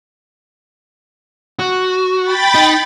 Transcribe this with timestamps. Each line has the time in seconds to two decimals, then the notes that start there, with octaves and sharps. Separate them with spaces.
1.59 F#4
2.24 G5 B5 A6
2.55 D#4